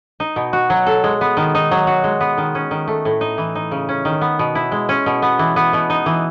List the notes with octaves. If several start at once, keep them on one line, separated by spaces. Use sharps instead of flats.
D#4
B2
F#4
F#3
A4
G#3
B3
D#3
D#4
F#3
F#4
G#3
B3
D#3
C#4
D#3
A3
A2
D#4
E3
D#4
C#3
C#4
D#3
B3
B2
E4
G#3
C#4
B2
B3
E3
B3
B2
D#4
E3